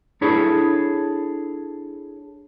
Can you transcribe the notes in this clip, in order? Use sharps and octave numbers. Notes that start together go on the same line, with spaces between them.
D4 E4 G#4 A4 C#5 B5